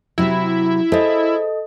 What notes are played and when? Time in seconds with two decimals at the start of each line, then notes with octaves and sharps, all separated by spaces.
0.18 C3 F#3 E4
0.92 G#4 A4 C5 D#5 E5